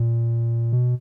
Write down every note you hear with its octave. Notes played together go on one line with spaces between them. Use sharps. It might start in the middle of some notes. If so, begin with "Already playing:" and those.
Already playing: A#2
B2